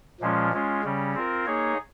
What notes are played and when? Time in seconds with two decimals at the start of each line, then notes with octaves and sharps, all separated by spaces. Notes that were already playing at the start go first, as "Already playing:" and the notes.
0.21 A#2 F3 G#3 C#4 F4
0.52 G#3 C#4 F4
0.83 C#3 G3 C#4
1.14 C4 F4 A#4
1.46 A#3 D#4 G#4 C#5